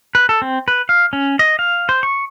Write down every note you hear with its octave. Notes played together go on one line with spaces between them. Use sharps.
B4
A4
C4
B4
F5
C#4
D#5
F5
C5
C#6